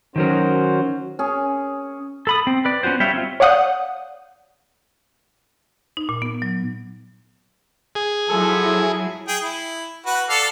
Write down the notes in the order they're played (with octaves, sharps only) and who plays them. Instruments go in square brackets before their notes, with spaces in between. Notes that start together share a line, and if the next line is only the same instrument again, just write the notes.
[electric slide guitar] D#3 F#3 A#4 [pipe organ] C#4 F#4 C5
[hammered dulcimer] C#4 G#4
[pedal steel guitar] A4 B5 D#6
C4
B4 D5
B3 C#4 F4 F#4 C5
G3 C#5 E5 F5 G5
C4 E4 F4
[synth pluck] C#5 D5 F5 F#5 D#6 G6
[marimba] D#4
A#2
B3
F#3
[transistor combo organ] G#4
[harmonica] F3 A4 E6 [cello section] F#3 E4 [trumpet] G#5
[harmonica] G#4 G5 D#6
E4
F#4 B4
A4 D5 F5